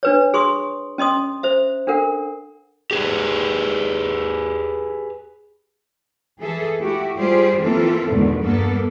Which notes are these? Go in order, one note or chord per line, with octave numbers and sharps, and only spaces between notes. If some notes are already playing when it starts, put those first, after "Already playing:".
D4 B4 C#5
G#4 C6 C#6 D#6
C#4 D#5 C6 D#6
C5 E5
D4 A4 A#4 F#5
G4 G#4 B4
E3 G#4 A4 E5
A3 E4 F#4 G4
G3 F4 G4 G#4 C5
E3 A#3 C4 E4 F4 A4
E2 G#2 B2 D3 D#3
G2 A#3 B3 A4